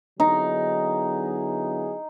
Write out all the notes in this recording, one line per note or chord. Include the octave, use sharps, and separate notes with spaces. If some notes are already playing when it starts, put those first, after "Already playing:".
D3 F#3 B3 D#4 E4 G#4